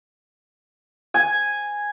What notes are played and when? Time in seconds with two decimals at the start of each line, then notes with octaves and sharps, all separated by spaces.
1.14 G#5